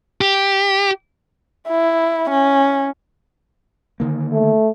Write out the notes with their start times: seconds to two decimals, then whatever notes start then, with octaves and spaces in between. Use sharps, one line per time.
0.21 G4
1.68 E4
2.30 C#4
4.00 D3 D#3 A#3
4.33 A3